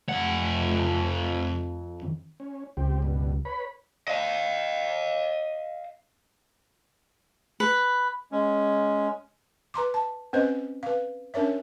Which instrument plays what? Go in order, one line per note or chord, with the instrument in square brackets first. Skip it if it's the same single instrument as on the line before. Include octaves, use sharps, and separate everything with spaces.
[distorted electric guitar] F2 F#5
[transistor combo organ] C#4
[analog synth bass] C#2 [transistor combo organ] C4 G4
[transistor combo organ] G2 B2
B4 C#5 B5
[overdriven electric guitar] D#5 F5
[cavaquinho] B4
[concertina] G#3 C#4
[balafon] B4 A#5 C6 D6
A5
C4 C#4 B4 C5 D#5
B4 F5
C#4 D4 A#4 C#5 E5